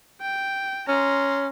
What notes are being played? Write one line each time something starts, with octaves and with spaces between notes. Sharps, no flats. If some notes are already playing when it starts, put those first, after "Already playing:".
G5
C#4 A#5 C6